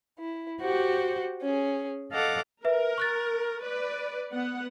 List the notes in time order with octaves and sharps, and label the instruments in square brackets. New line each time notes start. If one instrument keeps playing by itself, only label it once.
[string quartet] E4
F#4 G4 C5 F#5
C#4 G#4
A4 D#5 F5 F#5 D6
[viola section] A#4 [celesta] B4 E5
[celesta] C#6 F#6 A6
[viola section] B4 D5
B3 F#5